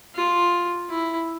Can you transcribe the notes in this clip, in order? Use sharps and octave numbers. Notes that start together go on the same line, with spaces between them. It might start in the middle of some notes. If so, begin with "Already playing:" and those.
F4
E4